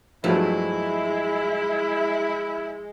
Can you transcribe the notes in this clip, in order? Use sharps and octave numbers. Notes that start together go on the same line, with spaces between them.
G2 F3 F#3 G#3 A3 E4